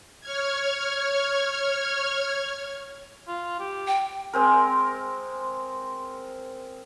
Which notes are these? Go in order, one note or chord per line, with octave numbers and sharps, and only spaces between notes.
C#5 F6 G#6
F4
G4
G5
G#3 C4 A#4